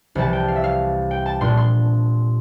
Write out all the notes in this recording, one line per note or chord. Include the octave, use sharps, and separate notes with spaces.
C2 C3 E3 G3 A5
G5
F5
E5
F5
G5
A5
A#2 G3 D4 C6
C6